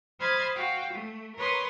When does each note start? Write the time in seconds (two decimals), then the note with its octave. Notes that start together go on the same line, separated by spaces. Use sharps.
0.19 C5 D#5 B5 F6 G#6 A6
0.54 F#4 F5 G5
0.93 A3
1.36 A#4 B4 C#5 C6 C#6 D#6